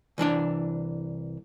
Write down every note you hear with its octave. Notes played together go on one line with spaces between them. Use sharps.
C2 E3 D4 D5